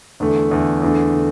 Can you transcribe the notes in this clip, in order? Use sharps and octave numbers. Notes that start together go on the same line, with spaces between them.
E2 D3 A3
E2 D3 A3
E2 D3 A3
D3